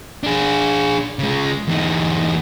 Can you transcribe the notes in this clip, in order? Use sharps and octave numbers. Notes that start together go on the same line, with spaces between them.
D4 G#4
C#3 G#3
E2 D#4